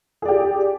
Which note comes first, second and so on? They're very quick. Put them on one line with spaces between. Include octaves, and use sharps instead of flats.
G#4 D5 G4